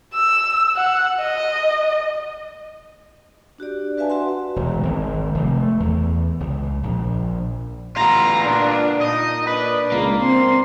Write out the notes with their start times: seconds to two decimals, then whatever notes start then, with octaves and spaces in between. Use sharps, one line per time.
0.14 E6
0.76 F#5
1.22 D#5
3.58 D4 F#4 G4 D5
3.98 F#4 B4 E5 F5 G#5 A5
4.10 F#4 E5 F#5 C6
4.56 E1
4.83 G#1
5.34 F1
5.63 A3
5.80 E2
6.40 C#2
6.83 A#1
7.96 A1 B3 F4 A#5
8.44 A#2 D4
9.02 A#2 D#4 D#5
9.48 D4 B4
9.92 C#2 A#3
10.21 C4 C6